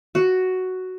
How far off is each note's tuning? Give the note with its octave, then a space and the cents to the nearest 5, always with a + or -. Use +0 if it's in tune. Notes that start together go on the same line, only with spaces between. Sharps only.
F#4 +5